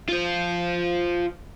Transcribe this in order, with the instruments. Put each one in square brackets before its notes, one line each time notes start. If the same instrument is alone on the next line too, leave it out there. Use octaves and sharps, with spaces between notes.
[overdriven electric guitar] F4 C5